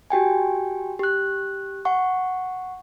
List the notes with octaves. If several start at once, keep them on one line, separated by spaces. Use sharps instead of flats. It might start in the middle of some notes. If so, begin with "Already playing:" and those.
F#4 G4 G5 G#5
G4 F#6
F#5 C#6